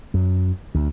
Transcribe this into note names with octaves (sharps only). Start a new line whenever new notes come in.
F#2
D2